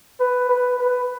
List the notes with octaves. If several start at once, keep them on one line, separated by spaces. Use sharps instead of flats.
B4
B4
B4